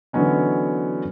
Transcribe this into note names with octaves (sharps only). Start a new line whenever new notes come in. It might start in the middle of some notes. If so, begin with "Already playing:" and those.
D3 E3 F#3 B3 C#4 D#4